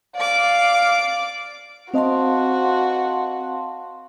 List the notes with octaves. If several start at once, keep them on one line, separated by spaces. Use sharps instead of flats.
D5 F5 D6
C4 F#4 C5 D#5 F5 A5 C6